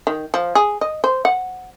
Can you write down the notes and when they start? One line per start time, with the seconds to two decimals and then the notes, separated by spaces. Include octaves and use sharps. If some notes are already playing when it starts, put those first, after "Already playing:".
0.07 D#3
0.34 F3
0.55 G#4
0.81 D#5
1.04 C5
1.25 F#5